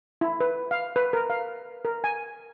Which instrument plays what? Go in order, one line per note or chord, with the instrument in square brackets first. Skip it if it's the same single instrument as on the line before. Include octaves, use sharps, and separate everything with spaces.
[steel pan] E4
B4
F5
B4
A#4
F5
A#4
G#5